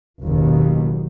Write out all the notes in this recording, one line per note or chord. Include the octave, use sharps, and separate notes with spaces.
F#1 D#2 B2